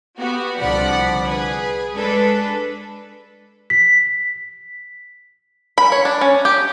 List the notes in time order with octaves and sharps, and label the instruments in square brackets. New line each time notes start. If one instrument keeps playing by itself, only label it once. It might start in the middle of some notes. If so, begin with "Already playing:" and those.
[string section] B3 F#4 G4
C2 D3 F3 D5 F#5 B5
G#4 B4
G#3 D4 A4 B4
[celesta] B6
[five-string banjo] B5
C#5
D4
C#4
G4